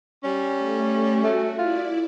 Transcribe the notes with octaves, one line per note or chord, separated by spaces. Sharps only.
G3 C#4
A3
A3 F#4
E4 F4 D5